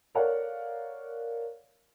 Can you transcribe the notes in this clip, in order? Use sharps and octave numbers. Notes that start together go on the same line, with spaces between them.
A4 A#4 C#5 D5 F5 F#5